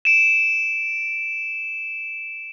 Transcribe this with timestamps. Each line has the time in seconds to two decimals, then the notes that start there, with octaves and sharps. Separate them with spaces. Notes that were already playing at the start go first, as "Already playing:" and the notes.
0.05 D7 E7